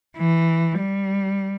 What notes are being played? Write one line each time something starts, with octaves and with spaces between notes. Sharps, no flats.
E3
G3